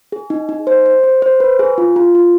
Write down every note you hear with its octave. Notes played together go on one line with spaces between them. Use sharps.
G#4
D#4
D#4
C5
C5
C5
C5
B4
G#4
F4
F4
F4